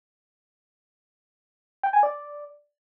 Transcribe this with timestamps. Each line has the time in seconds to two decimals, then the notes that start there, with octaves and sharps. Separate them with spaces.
1.83 G5
1.93 G#5
2.03 D5